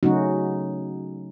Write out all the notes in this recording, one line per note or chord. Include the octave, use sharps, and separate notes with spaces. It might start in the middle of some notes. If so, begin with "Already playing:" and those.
C#3 F#3 A3 C#4 D#4 F#4